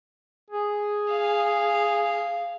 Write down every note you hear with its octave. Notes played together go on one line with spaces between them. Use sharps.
G#4
F5